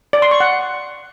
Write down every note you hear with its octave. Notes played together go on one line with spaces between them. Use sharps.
D5
C6
C#6
F#5